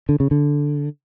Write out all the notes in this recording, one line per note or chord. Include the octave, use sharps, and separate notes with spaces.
D3
C#3
D3